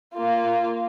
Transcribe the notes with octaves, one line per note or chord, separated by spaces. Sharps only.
A#3 F4